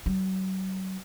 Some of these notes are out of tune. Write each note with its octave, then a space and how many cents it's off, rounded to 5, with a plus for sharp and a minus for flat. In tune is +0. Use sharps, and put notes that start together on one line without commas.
F#3 +35